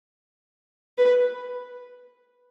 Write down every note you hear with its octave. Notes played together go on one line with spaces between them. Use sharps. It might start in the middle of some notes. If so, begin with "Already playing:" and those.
B4